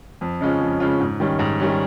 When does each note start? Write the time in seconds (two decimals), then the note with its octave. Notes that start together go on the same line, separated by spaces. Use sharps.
0.21 F2
0.41 C#3 G#3 C#4 F4
0.61 F2
0.80 C#3 G#3 C#4 F4
1.00 G#2
1.20 D#3 G3 C#4
1.39 G#2
1.60 D#3 G3 C#4